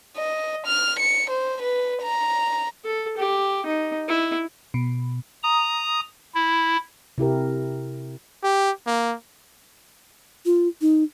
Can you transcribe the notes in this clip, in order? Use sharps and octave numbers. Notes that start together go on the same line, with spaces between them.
D#5
F6
C#7
C5
B4
A#5
A4
G4
D#4
E4
B2
A#5 D#6
E4
C3 E4 G4 A#4
G4
A#3
F4
D#4